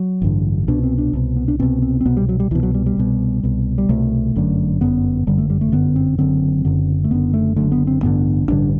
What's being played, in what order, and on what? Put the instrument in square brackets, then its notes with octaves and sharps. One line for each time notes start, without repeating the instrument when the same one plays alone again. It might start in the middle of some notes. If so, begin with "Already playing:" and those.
Already playing: [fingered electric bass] F#3
A1 G2 D3
C2 B2 D4
C4
D4
C2 B2
B3
D4
C2 B2 C4
C4
C4
C2 B2 B3
G3
F#3
G3
C2 B2 E3
F#3
G3
G3
C2 B2
C2 B2
G3
C2 B2 A3
G1 F#2 D3
G1 F#2 D3 B3
G1 F#2 D3 G3
A3
G3
A3
G1 F#2 D3 B3
C4
F#1 F#2 D3 C4
F#1 F#2 D3
A3
F#1 F#2 D3 B3
A3
F#1 F#2 D3 A3
B3
C4
A1 G2 D3 B3
A1 G2 D3 D4